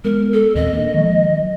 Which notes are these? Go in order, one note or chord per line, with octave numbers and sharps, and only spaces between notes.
G#3 B3 A#4
A4
D#2 A#2 C4 D#5
A#3 D4
D#3 F3 G#3
F#3